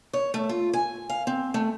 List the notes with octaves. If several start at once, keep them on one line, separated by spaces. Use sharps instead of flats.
C#5
A3
F4
G#5
F5
C4
A3